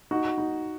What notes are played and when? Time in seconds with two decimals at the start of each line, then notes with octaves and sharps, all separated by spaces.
0.11 D#4 F#4
0.38 D#4